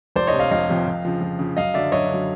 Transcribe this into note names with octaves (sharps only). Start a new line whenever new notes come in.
F1 C5 D5
C#5 D#5
F2 C3
D#5 F5
F1 D#5 F5
F2 C3
F2
C#3 F3
F2
C#3 F3
F#2 D#5 F5
D3 F#3 D5 E5
F#2 C#5 D#5
D3 F#3